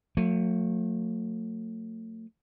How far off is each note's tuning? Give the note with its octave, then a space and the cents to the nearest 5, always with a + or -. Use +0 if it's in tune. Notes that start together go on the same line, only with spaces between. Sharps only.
F#3 -40 A3 +35